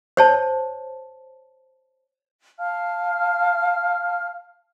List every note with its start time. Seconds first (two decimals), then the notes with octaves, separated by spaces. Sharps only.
0.17 C5 C#5 A5
2.59 F5 A5 F6